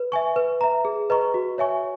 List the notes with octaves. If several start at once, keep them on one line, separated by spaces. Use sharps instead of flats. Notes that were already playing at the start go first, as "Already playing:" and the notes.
Already playing: B4
E5 G#5 C#6
B4
E5 A#5
G#4
B4 D#5 A#5 C#6
F#4
C#5 E5 G#5 C#6